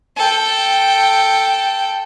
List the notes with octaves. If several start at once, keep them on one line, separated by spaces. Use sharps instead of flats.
A4 G5